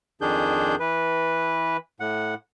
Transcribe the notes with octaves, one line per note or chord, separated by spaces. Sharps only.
F2 D#3 D4 G#4 G6
E3 B4
A2 F#5